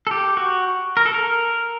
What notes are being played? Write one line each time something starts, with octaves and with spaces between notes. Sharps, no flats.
A4
G4
F#4
A#4
A4
A#4